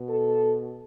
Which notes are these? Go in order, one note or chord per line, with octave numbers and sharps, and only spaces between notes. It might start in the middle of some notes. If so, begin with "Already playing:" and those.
Already playing: B2
A4